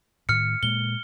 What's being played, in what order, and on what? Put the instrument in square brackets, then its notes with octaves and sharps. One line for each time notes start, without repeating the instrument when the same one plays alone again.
[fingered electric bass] A2 D#3 [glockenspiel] F6 C#7
[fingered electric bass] A#2 G#3 A#3 [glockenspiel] G7